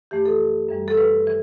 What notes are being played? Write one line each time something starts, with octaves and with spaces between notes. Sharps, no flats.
F#2 E3 A3 G4
A4
F#2 E3 G3
A4
B4
E3